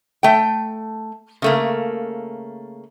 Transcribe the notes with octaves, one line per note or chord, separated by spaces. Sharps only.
A3 G5
C#3 A3 A#3